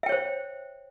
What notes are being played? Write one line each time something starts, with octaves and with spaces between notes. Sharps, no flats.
C5 C#5 E5 G5